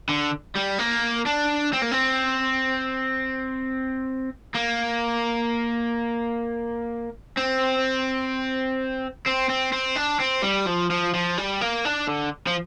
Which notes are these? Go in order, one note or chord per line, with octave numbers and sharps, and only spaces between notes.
D3
G3
A#3
D4
C4
A#3
C4
A#3
C4
C4
C4
C4
D4
C4
G3
F3
F3
F3
G3
A#3
D4
D3
F3